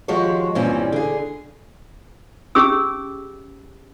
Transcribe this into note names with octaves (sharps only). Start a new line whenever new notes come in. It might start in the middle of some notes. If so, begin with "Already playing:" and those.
D#3 F3 G#3 F#4 G4 C#5
G2 A#2 E3 G3 C4 C#4
D3 G#4
C#4 G4 G#4 E6